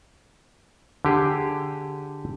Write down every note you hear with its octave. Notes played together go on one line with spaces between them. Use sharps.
D3 G4 G#4